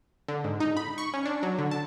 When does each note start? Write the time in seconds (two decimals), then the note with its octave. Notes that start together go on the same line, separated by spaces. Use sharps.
0.28 D3
0.44 G#2
0.60 D#4
0.77 B5
0.98 C#6
1.14 C#4
1.26 D4
1.43 F#3
1.58 D3
1.71 A5